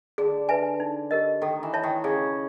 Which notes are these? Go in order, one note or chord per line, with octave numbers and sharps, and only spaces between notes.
D3 G#4
B4 E5 G#5
D#4
G4 A#4 D#5
D#3 A4
E3
C#5 E5 A5
D#3
C#3 G#4